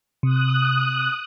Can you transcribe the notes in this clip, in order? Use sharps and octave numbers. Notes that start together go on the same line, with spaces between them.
C3 D#6 F#6